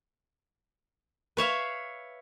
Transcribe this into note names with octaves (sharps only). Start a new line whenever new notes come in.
B4 C#5 E5 F5